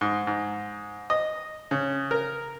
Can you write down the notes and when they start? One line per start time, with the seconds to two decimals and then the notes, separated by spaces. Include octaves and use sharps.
0.01 G#2
0.27 G#2
1.10 D#5
1.71 C#3
2.11 A#4